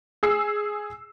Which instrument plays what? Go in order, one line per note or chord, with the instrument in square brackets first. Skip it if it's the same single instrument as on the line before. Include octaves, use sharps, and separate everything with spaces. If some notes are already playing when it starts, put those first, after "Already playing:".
[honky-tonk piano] G#4 E6 C7